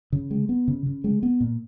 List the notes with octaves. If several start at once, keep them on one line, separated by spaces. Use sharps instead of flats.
C#3
G#3
B3
C#3
C#3
G#3
B3
A#2